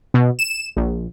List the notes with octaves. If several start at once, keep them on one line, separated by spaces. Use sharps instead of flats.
B2
E7
A#1